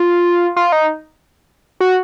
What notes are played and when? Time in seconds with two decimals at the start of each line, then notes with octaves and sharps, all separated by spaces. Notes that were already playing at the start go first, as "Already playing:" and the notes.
Already playing: F4
0.56 F4
0.72 D#4
1.81 F#4